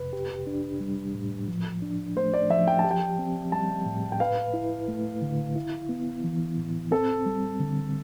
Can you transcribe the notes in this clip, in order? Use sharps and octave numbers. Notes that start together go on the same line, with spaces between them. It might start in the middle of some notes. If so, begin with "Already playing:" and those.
Already playing: F2 C3 B4
G4
D4
G3
A2
F3
D4
A3 C5
D5
F3 E5
G5
A5
G4
G5
C4
G3 A5
A2
G5
B4 F5
E4
A3
D3
E4
B3
E3
A2
C4 A4
G3
D3